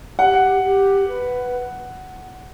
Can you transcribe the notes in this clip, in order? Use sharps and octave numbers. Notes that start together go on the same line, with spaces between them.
G4 F#5
G4
B4